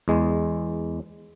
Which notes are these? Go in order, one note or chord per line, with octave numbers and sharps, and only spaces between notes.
E2 G#3